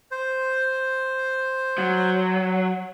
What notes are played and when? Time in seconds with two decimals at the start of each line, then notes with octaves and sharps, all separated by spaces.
0.11 C5
1.78 F#3